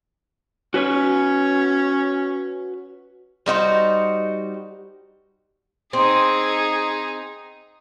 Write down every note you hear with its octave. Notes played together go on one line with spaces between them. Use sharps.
C#4 F#4 B4 C#5
G3 D#4 F#4 C5
C4 D#4 G#4